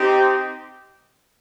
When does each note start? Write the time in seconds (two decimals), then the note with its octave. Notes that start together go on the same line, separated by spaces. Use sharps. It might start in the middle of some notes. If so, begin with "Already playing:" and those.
Already playing: C4 D#4 G4